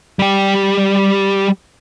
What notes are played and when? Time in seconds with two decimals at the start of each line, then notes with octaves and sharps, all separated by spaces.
0.19 G3 G4